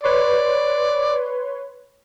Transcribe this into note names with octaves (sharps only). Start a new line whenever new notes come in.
B4 C#5 D5 C6